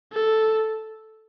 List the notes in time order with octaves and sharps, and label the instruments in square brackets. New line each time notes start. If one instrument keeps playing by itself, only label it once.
[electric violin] A4